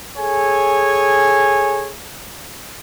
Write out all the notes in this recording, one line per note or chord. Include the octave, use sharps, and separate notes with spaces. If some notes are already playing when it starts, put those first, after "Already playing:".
G#4 A4 C#5 G#5